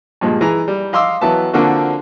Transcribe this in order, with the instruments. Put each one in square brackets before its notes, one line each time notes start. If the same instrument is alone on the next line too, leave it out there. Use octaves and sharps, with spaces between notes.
[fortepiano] G2 A#2 F3 G#3
E3 G#4 A#5
G3
D#5 F5 C6 D6 E6
E3 F#3 B3 E5 A5
D3 F3 A#3 C4 D4 F#4